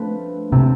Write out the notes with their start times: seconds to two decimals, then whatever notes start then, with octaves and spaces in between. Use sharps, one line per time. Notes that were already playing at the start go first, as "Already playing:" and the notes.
Already playing: F3 A3 C4 D4 F4 B4
0.52 C3 A3 C4 E4